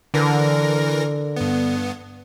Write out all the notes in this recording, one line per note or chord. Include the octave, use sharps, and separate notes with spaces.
D3 E3 A#4 A#6
G2 B3